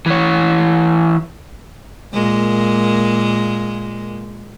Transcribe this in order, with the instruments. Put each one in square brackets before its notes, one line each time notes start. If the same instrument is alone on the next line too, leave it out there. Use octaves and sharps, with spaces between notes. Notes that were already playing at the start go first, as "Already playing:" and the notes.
[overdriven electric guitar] E3 C#5
[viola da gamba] A#2 G#3 A#3